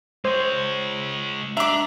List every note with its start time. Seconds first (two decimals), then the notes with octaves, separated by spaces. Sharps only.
0.25 G#3 C5 C#5
1.57 D4 E5 A#5 D6